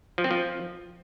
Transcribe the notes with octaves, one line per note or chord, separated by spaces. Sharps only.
F3
C4
F3